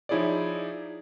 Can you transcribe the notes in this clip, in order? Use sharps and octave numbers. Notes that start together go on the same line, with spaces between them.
F3 D#4 E4 G#4 C#5 D5